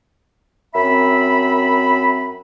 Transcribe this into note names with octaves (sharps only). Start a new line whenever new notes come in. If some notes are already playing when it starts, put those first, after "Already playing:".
F#2 C4 E5 B5